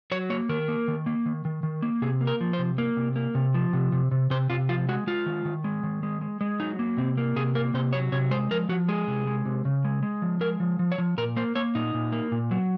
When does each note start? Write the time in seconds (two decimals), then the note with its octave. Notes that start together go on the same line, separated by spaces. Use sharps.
0.12 F#3 C#5
0.30 A#3 C#5
0.49 D#3 A#4
0.68 A#3
0.88 D#3
1.06 A#3
1.26 D#3
1.45 D#3
1.63 D#3
1.82 A#3
2.02 C3 G#4
2.21 A#3
2.27 A#4
2.41 F3
2.53 C5
2.59 C3
2.78 A#3
2.97 C3
3.16 A#3
3.35 C3
3.54 F3
3.73 C3
3.92 C3
4.11 C3
4.30 C3 C5
4.50 C3 F4
4.69 F3 F4
4.89 G#3 F#4
5.07 G#3 F4
5.26 D#3
5.45 D#3
5.64 G#3
5.83 D#3
6.03 G#3
6.21 G#3
6.41 G#3
6.60 F#3 D#4
6.79 A#3
6.97 C3 C4
7.17 A#3
7.36 C3 G#4
7.55 A#3 A#4
7.74 C3 C5
7.93 F#3 C#5
8.12 C3 C#5
8.31 G#3 C5
8.51 F3 A#4
8.69 F3 F#4
8.88 G#3 G#4
9.07 C3
9.27 G#3
9.45 C3
9.65 C#3
9.85 G#3
10.03 G#3
10.22 F3
10.41 G#3 A#4
10.60 F3
10.79 F3
10.92 C#5
10.98 F3
11.18 A#2 A#4
11.36 A#3 C5
11.55 A#3 C#5
11.75 A#2 D#4
11.94 A#2
12.12 A#3
12.32 A#2
12.51 F#3